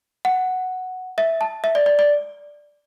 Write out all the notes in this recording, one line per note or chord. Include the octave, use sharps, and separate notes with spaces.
F#5
E5
A5
E5
D5
D5
D5